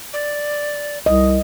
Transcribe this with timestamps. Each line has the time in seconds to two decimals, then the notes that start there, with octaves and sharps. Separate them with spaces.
0.13 D5
1.06 C2 D#5